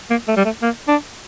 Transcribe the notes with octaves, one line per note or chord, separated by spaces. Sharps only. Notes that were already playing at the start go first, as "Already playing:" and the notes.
A#3
A3
G3
A3
A#3
D4